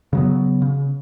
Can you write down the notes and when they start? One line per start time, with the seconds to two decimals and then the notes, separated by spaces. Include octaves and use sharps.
0.13 C#3 F#3 B3
0.62 C#3